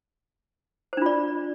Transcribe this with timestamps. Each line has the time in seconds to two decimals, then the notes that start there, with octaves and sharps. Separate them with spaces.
0.93 C5
0.97 D4
1.02 F4
1.06 D5